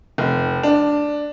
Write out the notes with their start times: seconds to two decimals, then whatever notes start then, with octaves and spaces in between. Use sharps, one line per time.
0.18 F1
0.63 D4